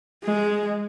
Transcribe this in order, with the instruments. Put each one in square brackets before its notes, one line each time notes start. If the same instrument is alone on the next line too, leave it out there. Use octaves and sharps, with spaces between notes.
[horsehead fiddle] G#3